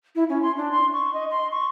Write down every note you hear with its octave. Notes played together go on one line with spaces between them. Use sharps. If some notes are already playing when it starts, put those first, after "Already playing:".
E4
C#4
C6
D4
C6
C#6
D#5
C6
C#6